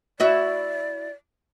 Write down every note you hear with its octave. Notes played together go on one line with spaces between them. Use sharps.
E4 F#4 D5 E5